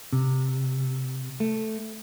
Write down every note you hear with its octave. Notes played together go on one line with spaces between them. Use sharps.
C3
A3